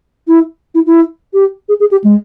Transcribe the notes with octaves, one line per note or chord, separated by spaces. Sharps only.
E4
E4
E4
G4
G#4
G#4
G4
G#3